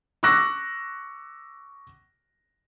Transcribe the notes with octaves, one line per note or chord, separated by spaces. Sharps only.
C#6 D6 E6 F#6 A#6